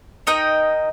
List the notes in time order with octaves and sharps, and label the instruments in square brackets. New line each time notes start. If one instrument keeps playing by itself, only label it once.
[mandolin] D#4 A#4 D#5 G5